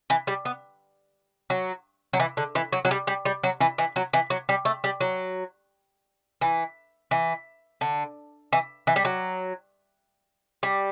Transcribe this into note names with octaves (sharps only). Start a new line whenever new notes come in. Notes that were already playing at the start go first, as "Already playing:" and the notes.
E3
G3
B3
F#3
F#3
E3
D3
E3
F#3
F#3
G3
G3
G3
F#3
E3
E3
F#3
E3
F#3
G3
A3
G3
F#3
E3
E3
D3
E3
E3
G3
F#3
G3